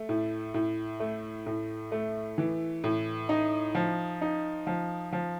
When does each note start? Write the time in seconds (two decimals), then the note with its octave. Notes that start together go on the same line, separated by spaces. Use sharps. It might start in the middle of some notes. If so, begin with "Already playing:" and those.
Already playing: A3
0.09 A2
0.54 A2
1.00 A3
1.46 A2
1.92 A3
2.38 E3
2.84 A2
3.29 D#4
3.75 F3
4.21 D#4
4.67 F3
5.12 F3